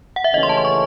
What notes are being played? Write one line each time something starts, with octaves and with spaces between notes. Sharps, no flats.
F#5
E5
D#2 C#3 E3 A3 C#4 D#5
C6
A5
C6
C#6